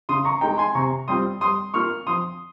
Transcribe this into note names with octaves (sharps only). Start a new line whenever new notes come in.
C#3 C6 D#6
A#5 C#6
G#3 D#4 G5 A#5
G#5 C6
C3 A#5 C#6
G3 C4 F4 C6 D#6
G3 C6 D#6
A#3 F4 C#6 F6
F3 C6 D#6